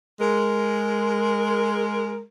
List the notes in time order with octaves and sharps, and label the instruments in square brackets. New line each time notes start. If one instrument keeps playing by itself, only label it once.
[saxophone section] G#3 A#4